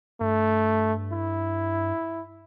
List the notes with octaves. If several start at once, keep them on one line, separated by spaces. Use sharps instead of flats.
G2 A3
E4